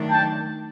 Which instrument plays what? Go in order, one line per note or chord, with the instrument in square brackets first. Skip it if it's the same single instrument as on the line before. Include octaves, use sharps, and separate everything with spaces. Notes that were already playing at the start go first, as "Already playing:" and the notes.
Already playing: [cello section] D#3 F#3 A3 D4
[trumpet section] G5 A5